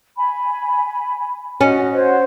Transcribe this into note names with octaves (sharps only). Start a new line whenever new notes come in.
G#5 B5
C#4 F#4 D#5
F#4 C5 C#5 F#5